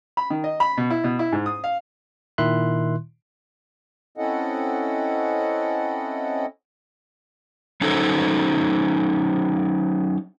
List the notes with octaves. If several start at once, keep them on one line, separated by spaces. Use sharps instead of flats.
B5
D#3
D#5
B5
B2
E4
B2
E4
G#2
D#6
F5
A#2 D#3 E4 E5 C6 F#6
C4 C#4 E4 A4 D#5 F#5
F#3 C#4 D#4 F#4 A4 C5